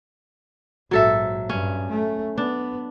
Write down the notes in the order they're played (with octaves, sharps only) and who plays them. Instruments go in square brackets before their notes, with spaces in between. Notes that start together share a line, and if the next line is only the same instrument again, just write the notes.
[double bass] A#1 G#2 [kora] F#3 A4 E5
[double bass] G2 [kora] C#4
[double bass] A3
[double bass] B3 [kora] D4